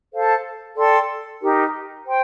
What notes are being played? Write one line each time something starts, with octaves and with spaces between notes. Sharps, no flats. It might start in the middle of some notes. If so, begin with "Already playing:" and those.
A4 C5 F5 A5
A4 D5 G5 C6
D#4 G4 A#4
C5 G5 C6